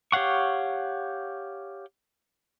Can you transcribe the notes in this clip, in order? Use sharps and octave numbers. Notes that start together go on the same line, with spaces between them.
G4 C#5 F5 F#5 C#6